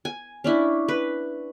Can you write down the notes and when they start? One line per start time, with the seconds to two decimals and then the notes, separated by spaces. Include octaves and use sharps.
0.05 G#5
0.44 C#4 D4 E4
0.88 B4